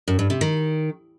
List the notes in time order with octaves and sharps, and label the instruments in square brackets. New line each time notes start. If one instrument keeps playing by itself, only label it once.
[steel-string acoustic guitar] F#2
G2
C3
D#3